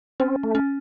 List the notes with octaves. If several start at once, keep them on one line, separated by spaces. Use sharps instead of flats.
C4 C#4
A3
C#4